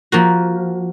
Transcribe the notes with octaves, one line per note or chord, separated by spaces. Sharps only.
F3 A#3 F#4